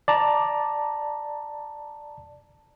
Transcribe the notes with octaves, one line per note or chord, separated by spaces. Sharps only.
D5 A5 A#5